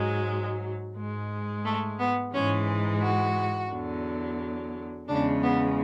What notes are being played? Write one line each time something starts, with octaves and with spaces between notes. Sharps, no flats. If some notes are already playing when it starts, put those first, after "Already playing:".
Already playing: G#2 F#3 G#3
G#2 G#3
A3
B3
G#2 E3 G#3 C#4
F#4
E2 D3 F#3
E2 C#3 G#3 D4
B3